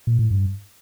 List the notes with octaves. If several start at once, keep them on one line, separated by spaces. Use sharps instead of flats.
A#2
A2
G2